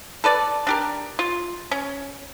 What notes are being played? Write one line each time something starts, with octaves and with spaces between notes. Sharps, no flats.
A4 B4 D5
D4 G4 A#4
F4
C#4